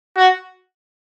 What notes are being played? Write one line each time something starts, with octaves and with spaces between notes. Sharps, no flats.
F#4